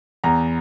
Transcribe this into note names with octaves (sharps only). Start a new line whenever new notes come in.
E2 A#5